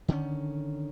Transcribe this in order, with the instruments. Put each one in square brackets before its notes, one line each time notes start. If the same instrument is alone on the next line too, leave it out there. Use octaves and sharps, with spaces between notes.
[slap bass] D3 D#3 A3 C#4